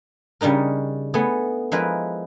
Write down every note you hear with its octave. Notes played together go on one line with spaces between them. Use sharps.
C#3 G3 D4 D#4 A#4
A3 B3 G#4
F3 G#3 E4 A#4 B4